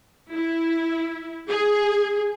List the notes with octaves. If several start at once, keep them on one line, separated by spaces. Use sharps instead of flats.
E4
G#4